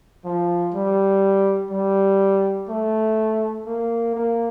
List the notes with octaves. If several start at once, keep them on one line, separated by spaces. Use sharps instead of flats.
F3
G3
G3
A3
A#3
A#3